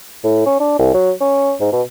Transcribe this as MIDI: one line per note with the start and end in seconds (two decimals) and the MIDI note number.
0.24 0.46 45
0.46 0.57 61
0.60 0.76 62
0.79 0.91 36
0.94 1.11 54
1.21 1.53 61
1.60 1.72 44
1.72 1.82 47